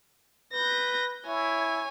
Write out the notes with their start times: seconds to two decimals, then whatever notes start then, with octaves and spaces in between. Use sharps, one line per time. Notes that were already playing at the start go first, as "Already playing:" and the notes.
0.53 B4 G6 A#6
1.27 E4 C#5 G#5